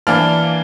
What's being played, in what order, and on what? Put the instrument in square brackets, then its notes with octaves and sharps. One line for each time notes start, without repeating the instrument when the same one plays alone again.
[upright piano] E3 A#3 D4 F6